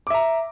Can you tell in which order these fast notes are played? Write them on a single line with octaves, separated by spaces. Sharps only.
D6 E5 A#5